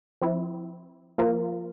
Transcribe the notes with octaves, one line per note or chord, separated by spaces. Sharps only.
F3 C4 E4
F3 A#3 F4 A#4